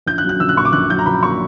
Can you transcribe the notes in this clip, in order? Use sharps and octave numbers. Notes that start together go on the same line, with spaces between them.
A#1 G6
F#6
F#3
F#6
A#1 E6
F#6
A#2 C#6
D6
A#1 F#6
F#3 G6
A#5
A#1 B5
A#2 C#6